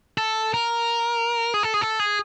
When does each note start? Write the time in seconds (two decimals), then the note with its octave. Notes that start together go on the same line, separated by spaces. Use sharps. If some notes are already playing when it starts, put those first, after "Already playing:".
0.18 A4
0.54 A#4
1.54 G#4
1.63 A4
1.74 G#4
1.81 A4
2.00 G#4